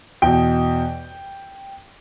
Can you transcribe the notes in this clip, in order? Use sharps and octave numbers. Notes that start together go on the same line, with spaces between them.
E2 B2 G5